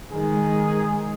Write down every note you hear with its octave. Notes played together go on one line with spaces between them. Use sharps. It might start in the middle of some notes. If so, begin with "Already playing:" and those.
D#3 G#3 G#4